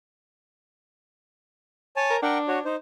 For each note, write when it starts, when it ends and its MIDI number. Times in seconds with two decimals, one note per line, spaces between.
1.97 2.16 73
1.97 2.16 80
1.97 2.16 81
2.10 2.22 70
2.22 2.66 62
2.22 2.38 70
2.22 2.38 78
2.22 2.38 79
2.48 2.59 66
2.48 2.59 73
2.65 2.76 63
2.65 2.76 72